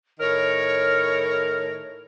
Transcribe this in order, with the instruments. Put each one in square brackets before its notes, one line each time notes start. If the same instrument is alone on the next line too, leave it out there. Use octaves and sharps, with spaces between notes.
[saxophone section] A2 D#3 A#4 [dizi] C#5